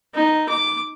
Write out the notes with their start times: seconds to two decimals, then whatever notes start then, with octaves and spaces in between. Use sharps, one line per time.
0.14 D#4
0.49 D6